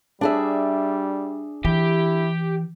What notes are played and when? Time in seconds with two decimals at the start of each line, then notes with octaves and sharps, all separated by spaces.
0.21 G3 D4 G#4 E5
1.65 E3 E4 G4